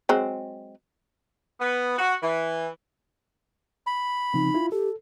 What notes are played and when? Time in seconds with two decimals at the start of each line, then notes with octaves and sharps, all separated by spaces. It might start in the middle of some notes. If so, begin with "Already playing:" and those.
0.09 F#3 G#3 C4
1.59 B3
1.97 F#4
2.21 E3
3.87 B5
4.34 C#3 F3 C4 D#4
4.54 E4 F4
4.72 G4 A4